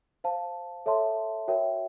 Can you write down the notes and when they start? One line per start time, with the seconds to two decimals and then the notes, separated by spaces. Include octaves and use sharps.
0.24 C5 F5 A5
0.86 A4 C#5 E5 A5 C6
1.48 F#4 A#4 C#5 E5 G5